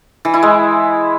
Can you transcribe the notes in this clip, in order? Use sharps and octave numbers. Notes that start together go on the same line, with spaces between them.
E3
E4
G#3